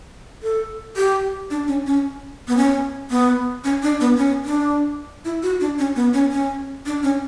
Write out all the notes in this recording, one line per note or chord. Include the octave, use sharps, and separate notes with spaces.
A4
G4
D4
C#4
C#4
B3
C#4
B3
C#4
D4
B3
C#4
D4
E4
F#4
D4
C#4
B3
C#4
C#4
D4
C#4